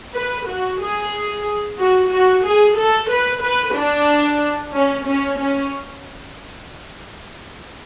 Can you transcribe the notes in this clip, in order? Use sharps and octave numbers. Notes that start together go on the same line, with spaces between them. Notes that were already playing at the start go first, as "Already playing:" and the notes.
B4
F#4
G#4
F#4
F#4
G#4
A4
B4
B4
D4
C#4
C#4
C#4